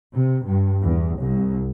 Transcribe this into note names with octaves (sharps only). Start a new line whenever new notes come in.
C3
G2
E2
C2